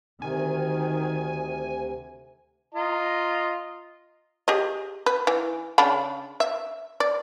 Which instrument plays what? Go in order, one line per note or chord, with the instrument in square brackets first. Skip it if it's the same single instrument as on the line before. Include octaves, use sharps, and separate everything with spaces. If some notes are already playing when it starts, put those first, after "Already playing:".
[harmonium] D2 C3 [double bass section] D#3 [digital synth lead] G#5
[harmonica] F4 D#5 A#5
[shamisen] G4 G#4 D#5
B4
E3
C#3 D4 B5
E5
D5